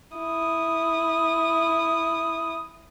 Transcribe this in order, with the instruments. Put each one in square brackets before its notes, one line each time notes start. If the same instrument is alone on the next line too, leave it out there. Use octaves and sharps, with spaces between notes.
[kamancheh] E4 D#6